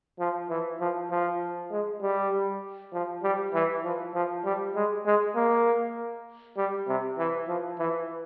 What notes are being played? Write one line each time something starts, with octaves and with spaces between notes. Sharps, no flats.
F3
E3
F3
F3
G#3
G3
F3
G3
E3
F3
F3
G3
G#3
G#3
A#3
G3
C3
E3
F3
E3